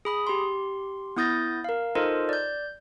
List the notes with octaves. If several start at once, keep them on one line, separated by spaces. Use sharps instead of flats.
G#4 B5 D#6
G4 C6
B3 E4 D#6 G6 A6 A#6
A#4 F5
D#4 F4 A4 A#4 C5 D#5
D5 G6